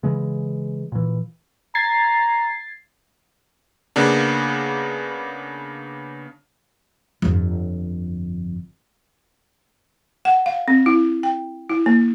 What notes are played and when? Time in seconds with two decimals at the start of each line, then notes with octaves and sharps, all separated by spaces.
0.03 C#3 E3 G#3
0.92 A#2 E3
1.75 A#5 G#6 A6 C7
3.96 C#3 A#3 B3 D4
7.22 G1 F2
10.25 F#5
10.46 F5
10.68 C4
10.86 E4
11.23 G5
11.70 E4
11.86 A#3